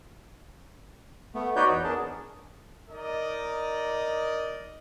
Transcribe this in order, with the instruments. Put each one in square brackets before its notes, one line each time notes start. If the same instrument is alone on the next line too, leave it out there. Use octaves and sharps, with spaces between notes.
[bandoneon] A3 B3
D#4 F#4 B4 C#5 D5 G6
E2
B3 D4 G#4 A#4 A5
[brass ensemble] D#4 A#4 D5 D#5